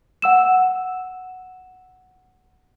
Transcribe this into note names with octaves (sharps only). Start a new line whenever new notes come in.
F#5 E6 E7